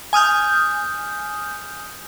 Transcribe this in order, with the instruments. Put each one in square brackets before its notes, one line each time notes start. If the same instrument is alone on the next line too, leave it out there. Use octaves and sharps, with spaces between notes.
[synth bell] G#5 D#6 F6 G6